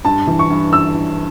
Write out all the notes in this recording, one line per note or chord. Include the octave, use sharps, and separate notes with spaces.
G2 A5
E3
C#6
G2
E6